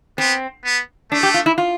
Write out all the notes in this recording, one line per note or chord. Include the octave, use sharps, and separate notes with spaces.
B3 C4
B3
A3 D4
G4
F4
E4
F4